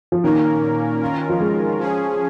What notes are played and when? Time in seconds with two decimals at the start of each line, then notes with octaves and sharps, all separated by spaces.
0.12 F3
0.23 A#2 D#3 A#3 C#4 A#4
1.02 D#3 C#4 F4 A#4
1.29 F3
1.40 G#3
1.79 F3 C#4 G#4